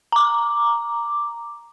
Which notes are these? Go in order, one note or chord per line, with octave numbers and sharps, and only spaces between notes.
A#5 D6